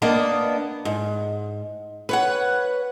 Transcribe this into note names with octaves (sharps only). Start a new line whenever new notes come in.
A#3 B3 D4 D#5
G#2
B4 C#5 F#5